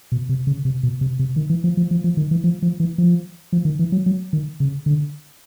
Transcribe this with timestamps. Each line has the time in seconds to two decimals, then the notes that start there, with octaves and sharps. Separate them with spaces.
0.12 B2
0.29 C3
0.47 C#3
0.65 C3
0.83 B2
1.01 C3
1.19 C3
1.36 D#3
1.50 E3
1.64 F3
1.77 F3
1.91 F3
2.04 F3
2.17 D#3
2.31 E3
2.44 F3
2.62 F3
2.80 E3
2.98 F3
3.53 F3
3.65 D#3
3.79 E3
3.92 F#3
4.06 F#3
4.33 D#3
4.60 C#3
4.86 D3